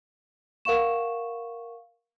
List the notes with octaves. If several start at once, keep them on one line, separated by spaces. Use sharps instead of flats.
A#4 F5 F#5 C#6 E7